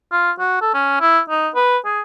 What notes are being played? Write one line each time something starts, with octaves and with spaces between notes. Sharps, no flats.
F4
F#4
A4
C#4
E4
D#4
B4
G#4